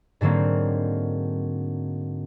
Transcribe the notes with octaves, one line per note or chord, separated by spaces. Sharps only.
G#2 D3 F#3 A#3 C4